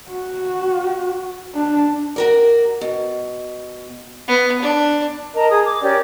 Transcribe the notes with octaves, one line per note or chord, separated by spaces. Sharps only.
F#4
D4
F#4 A#4 D5
B2
B3
D4
A#4 D#5 A5 A#5
G#4 D#6
D6
C#4 G4 A#4 D5